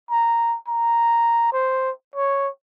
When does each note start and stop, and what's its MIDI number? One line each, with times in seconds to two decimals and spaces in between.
0.11 0.57 82
0.68 1.50 82
1.53 1.91 72
2.16 2.49 73